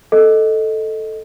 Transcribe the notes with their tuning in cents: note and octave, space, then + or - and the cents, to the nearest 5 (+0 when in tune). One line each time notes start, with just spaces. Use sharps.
A4 +0 D#5 +0